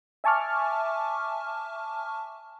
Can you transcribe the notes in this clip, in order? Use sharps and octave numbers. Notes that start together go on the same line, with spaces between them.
E5 G#5 A5 C#6 D6 F6